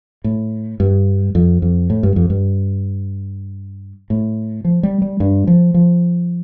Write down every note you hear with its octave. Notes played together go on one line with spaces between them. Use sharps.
A2
G2
F2
F2
A2
G2
F2
G2
A2
F3
G3
G3
G2
F3
F3